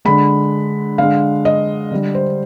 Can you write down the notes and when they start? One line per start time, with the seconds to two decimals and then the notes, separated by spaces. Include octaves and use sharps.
0.05 D3 G#3 B5
0.98 D3 G#3 F5
1.45 D#5
1.91 D3 G3
2.15 C5